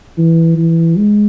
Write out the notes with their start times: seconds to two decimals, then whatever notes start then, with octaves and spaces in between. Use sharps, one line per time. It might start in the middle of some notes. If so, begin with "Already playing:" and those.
0.18 E3
0.57 E3
0.97 G#3